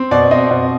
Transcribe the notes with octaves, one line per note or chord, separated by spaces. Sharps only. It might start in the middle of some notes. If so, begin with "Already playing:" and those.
Already playing: C4
B2 D5
C4 D#5
B2